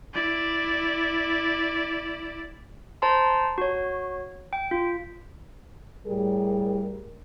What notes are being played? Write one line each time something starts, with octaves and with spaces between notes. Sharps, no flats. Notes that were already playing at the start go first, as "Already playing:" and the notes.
E4 D5
C5 A5 A#5 C6
F#4 C#5
G5
F4
A2 G3 G#4 A#4